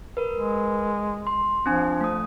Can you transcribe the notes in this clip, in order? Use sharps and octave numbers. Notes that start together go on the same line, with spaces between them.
A#4 B4
G#3
C6
F3 C4 D4 G#5
A3 D#6